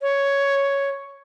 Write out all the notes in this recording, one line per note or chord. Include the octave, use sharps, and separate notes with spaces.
C#5